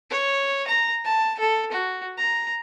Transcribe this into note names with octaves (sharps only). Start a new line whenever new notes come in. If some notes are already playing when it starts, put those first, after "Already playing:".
C#5
A#5
A5
A4
F#4
A#5